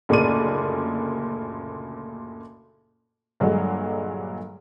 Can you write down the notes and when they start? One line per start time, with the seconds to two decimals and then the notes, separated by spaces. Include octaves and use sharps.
0.09 F#1 D2 A#2 C#3 D5 D#7
3.40 G2 A#2 D3 F#3 G#3 D4